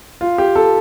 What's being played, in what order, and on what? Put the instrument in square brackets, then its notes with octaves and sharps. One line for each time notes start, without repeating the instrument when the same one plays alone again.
[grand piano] F4
G4
A4